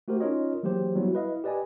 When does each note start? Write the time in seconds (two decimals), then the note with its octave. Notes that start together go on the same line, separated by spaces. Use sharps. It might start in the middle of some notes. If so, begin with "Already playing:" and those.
0.08 A3 F#4 G4 A#4 C5
0.20 C#4 D#4 F4 A#4 C#5 D#5
0.63 E3 F#3 G#3 A#3 G4 C5
0.96 F#3 G3 B3 E4 F#4
1.14 E4 B4 D#5 F5
1.44 G4 B4 D5 D#5 G#5